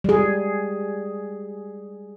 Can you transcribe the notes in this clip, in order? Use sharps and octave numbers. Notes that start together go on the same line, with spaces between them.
G3 G#4